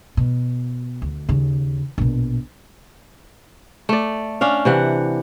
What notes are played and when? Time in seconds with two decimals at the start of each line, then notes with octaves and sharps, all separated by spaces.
0.17 B2
1.02 D2
1.29 D#2 C#3
1.98 A#1 B2
3.89 A3 D5
4.41 C#4 D4 F5
4.65 C3 E3 F#5